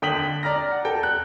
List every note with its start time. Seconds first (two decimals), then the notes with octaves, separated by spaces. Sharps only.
0.02 D3 G5 D#6 B6 F#7
0.43 D5 A#5 F6 A#6
0.72 F#5
0.85 A4 G5
1.03 F#6